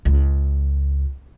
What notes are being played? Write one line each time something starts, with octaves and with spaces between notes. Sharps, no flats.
C#2